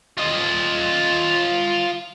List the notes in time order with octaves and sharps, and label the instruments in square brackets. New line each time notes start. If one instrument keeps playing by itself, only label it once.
[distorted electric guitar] F4 D#5